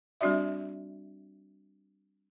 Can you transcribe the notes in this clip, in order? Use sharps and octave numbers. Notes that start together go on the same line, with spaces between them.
G3 C4 D4 F#4 D5 E5